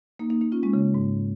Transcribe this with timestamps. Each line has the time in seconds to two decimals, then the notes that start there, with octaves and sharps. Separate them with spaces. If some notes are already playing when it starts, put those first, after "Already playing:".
0.19 A#3 D#4
0.30 A#3 D#4
0.41 A#3 D#4
0.52 C#4 F4
0.63 G#3 C#4
0.74 C#3
0.94 G#2